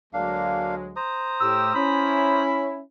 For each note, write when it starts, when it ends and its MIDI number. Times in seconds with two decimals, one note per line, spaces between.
0.13 0.94 38
0.13 0.94 54
0.13 0.94 56
0.13 0.75 58
0.13 0.75 62
0.13 0.75 77
0.96 2.43 72
0.96 2.43 82
0.96 2.43 87
1.41 1.72 45
1.41 1.72 67
1.41 1.71 88
1.75 2.81 61
1.75 2.81 64
1.75 2.76 83